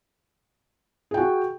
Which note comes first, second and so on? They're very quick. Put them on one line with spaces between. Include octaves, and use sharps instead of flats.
G#4 G5 F#4